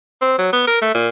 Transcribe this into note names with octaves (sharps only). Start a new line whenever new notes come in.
C4
F#3
B3
A#4
A3
A#2